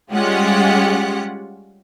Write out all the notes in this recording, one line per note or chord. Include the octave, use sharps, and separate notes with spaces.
G3 G#3 C#4 F4 G4 F#5